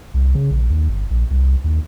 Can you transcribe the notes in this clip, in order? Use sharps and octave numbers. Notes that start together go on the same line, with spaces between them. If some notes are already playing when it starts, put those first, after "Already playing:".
C2
C#3
A#1
D#2
G1
A#1
C2
D#2